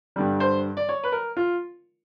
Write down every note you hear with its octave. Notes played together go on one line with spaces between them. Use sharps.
G2 D3 G3
C5
D5
C#5
B4
A#4
F4